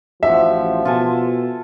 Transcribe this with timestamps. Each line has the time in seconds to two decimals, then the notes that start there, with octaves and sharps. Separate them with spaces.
0.23 A1 F3 F#4 G4 E5
0.85 B2 F4 A4 G#5